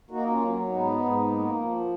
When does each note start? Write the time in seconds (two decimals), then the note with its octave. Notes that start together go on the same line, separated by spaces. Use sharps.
0.11 A#3 D#4 F#4
0.30 C#4 F4
0.40 F#3
0.69 G#2 B3 D#4
0.98 G#2
1.27 A#3
1.56 F3
1.80 B3